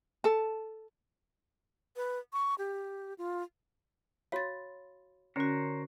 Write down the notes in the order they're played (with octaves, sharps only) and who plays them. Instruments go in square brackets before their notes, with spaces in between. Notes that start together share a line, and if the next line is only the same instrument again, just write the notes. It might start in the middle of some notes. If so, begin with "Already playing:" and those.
[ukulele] A4 A5
[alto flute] B4
C#6
G4
F4
[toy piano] F#4 C#5 F5 [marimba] B5 C6 A6
[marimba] D3 F#4 [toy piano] C#4 [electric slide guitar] A#4 C5 C#5